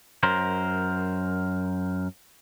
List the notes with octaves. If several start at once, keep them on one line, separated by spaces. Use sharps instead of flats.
F#2 A#4 C5